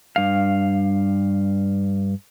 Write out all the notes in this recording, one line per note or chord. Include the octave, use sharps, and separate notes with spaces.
G2 F5